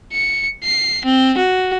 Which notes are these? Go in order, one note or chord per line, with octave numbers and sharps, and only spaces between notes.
C#7
C7
C4
F#4